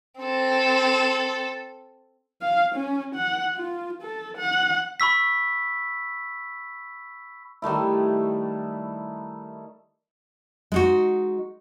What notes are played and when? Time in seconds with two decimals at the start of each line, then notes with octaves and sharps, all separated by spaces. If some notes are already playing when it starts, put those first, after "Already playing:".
0.21 C4 A4
2.42 F5
2.75 C#4
3.15 F#5
3.57 F4
4.02 A4
4.37 F#5
5.00 B5 C#6 E6 B6
7.62 D#3 G3 A3 E4
10.72 G#3 D#4 F#4